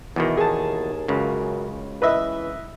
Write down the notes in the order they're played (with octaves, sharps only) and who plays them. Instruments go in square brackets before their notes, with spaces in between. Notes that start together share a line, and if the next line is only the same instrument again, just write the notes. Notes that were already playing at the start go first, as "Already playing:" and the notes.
[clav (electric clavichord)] E2 B2 D#3 [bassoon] E3
[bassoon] D#2 [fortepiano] G#4 A5
[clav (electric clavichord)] C#2 C#3 [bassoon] F#2
[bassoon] E3 [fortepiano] B4 D#5 E5